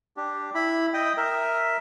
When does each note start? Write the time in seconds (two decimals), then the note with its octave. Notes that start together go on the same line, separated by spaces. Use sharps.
0.17 D4 G4
0.55 E4 B5
0.94 D#5 G5 D#6
1.17 A#4 E5